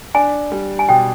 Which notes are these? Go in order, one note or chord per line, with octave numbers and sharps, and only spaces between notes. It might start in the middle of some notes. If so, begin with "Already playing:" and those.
D4 G#5
G3
G#5
B2 G5